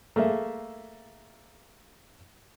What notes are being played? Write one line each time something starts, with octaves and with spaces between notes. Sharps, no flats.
A3 A#3 G#4 E5